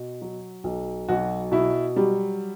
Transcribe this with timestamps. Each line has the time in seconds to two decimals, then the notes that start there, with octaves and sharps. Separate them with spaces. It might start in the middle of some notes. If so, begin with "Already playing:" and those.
Already playing: B2
0.22 F#3
0.64 B1
1.09 B1 F#4
1.51 B2 E4
1.96 F#3 G3